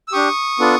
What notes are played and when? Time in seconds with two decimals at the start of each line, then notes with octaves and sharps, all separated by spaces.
0.08 E6
0.12 D4 G4 C#6 D#6
0.59 B3 D4 F4 A4